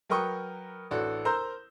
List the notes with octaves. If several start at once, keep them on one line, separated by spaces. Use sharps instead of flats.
F#3 A#4 B4 G5 C#6 D#6
A1 D4 F#4 A4
A#4 C5 A#5 C6 E6 G6